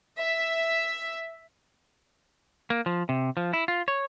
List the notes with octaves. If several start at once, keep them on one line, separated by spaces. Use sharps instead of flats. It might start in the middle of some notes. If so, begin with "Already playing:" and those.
E5
A#3
F3
C3
F3
E4
F4
C#5